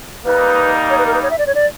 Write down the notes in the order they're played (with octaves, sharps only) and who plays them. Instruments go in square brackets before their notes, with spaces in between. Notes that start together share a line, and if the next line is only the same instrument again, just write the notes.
[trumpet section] G3 A#3 D#4 [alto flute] B4
[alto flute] C#5
B4
A#4
B4
C#5
E5
D5
C#5
D5